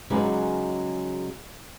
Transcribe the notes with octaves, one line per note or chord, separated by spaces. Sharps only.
C#3 F#3 G#3 D#4 B4 D5